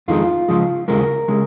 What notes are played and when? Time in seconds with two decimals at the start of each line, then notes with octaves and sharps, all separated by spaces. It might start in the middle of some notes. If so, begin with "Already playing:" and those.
0.08 F2 D#3 G#3 F4
0.48 C#2 C#3 F3 G#3
0.88 D#2 C#3 G#3 A#4
1.28 C#3 G#3